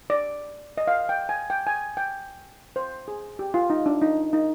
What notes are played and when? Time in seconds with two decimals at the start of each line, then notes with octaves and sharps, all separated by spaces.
0.10 D5
0.77 D#5
0.87 F5
1.09 G5
1.29 G#5
1.50 G5
1.67 G#5
1.97 G5
2.76 C5
3.08 G#4
3.39 G4
3.54 F4
3.70 D#4
3.86 D4
4.02 D#4
4.33 D#4